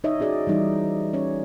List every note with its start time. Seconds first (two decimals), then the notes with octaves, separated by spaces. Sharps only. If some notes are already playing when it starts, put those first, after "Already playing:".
0.04 D#4 C#5 D#5 E5
0.20 C#4 F#4 G#4 D5
0.47 E3 G3 D#4
1.13 C#4 C#5 D5